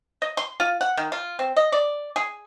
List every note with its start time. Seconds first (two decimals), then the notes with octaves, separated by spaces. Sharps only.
0.22 D#5
0.37 C6
0.60 F4
0.81 F#5
0.97 D#3
1.12 F4
1.39 C4
1.56 D#5
1.72 D5
2.16 G#4